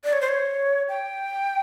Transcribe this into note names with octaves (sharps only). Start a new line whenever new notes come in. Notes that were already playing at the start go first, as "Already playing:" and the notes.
D5
C#5
C5
C#5
G5